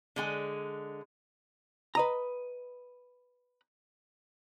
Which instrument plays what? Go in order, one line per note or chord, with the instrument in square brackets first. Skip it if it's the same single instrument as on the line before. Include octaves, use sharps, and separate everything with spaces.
[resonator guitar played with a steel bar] D3 G#3 G#5
[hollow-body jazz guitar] B4 D#5 A#5